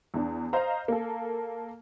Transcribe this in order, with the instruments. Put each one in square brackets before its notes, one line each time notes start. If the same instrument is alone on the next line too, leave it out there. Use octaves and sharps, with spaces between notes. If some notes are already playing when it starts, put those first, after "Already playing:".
[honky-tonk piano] E2 D4
C5 D#5 F5 A#5
A#3 A4